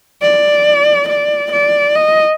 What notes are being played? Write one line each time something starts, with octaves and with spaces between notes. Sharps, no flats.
D5
D5
D5
D#5